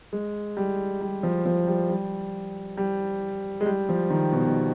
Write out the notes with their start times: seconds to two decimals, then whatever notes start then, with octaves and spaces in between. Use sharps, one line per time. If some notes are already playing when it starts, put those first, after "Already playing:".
0.13 G#3
0.57 G3
1.01 G3
1.23 F3
1.45 F3
1.67 G3
1.89 G3
2.77 G3
3.61 G#3
3.66 G3
3.89 F3
4.10 D#3
4.32 B2
4.47 B2